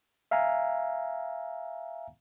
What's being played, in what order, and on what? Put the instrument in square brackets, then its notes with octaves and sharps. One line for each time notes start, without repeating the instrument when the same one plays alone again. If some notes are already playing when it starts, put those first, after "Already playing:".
[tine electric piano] E5 F5 G#5 A#5